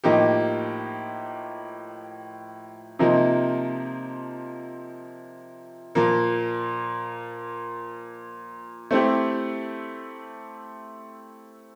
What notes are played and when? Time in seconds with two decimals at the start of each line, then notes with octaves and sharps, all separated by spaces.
0.04 A2 F3 A#3 D#4 G4
2.99 C3 F3 A#3 D#4
5.95 A#2 F3 A#3
8.91 A3 C4 E4 G4